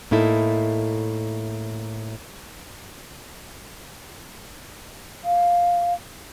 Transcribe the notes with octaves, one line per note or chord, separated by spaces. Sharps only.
A2 A#3 D#4 E4 A4
F5